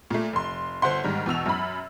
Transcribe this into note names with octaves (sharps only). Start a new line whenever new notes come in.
A#2 A3
F1 C6
G1 C5 F#5 C6
G#2 D#3 G3
E2 B2 E6 F7
F#2 B5